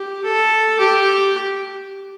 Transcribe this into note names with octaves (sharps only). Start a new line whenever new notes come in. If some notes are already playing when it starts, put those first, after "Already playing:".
Already playing: G4
A4
G4